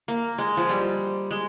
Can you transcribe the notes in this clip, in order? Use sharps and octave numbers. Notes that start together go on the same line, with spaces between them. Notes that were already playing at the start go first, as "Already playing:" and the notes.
A#3
G#3
F3
G3
G#3